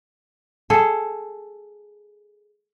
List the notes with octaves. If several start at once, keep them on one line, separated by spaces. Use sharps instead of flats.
G#4 A4